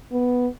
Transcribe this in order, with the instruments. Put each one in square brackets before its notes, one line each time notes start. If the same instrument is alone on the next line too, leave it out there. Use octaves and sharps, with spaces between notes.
[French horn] B3